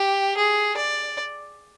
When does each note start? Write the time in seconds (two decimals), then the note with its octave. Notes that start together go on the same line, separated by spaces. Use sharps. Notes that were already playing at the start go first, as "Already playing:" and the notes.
Already playing: G4
0.37 G#4
0.77 D5